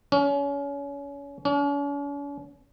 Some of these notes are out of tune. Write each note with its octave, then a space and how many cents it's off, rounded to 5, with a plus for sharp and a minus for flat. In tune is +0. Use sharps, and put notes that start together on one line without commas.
C#4 +30
C#4 +45